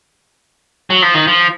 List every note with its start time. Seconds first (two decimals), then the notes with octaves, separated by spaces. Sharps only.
0.90 F#3
1.02 F3
1.14 D#3
1.27 F3